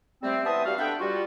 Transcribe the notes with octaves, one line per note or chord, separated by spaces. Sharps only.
G3 A3 C4
E3 B3 C5 E5 A5 D#6
G3 F#4 F5
A3 B3 D4 E5 F#5 G5
G3 F4 F#4